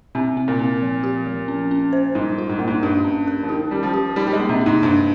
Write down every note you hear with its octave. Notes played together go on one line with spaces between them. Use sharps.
C3 C4
C4
A#2
C4
F3
G4
F3
C#4
C#4
C5
G#2 G3
F4
G#2
A#2 A#3
G#2
G2 G4
C#4
A#4
F3
D#3 G4
G3 C#4
F3
G4
G3 D#4
G3
G#3
A#3
C3
D#4
G#2
G2 C5